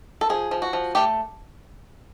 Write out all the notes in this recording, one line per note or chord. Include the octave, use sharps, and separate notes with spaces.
A4
F3 G#4
F3
F#4
F3
A3 G4